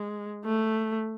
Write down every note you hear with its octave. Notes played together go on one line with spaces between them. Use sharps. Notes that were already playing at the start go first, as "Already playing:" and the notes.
Already playing: G#3
A3